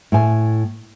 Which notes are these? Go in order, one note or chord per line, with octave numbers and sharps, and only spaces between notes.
A2 G#5